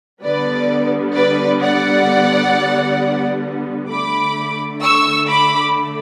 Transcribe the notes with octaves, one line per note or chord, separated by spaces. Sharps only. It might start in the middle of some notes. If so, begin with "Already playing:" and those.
D3 G3 B3 B4 D5
B4 D5
D5 F#5
D3 A3 B5 D6
C#6 E6
B5 D6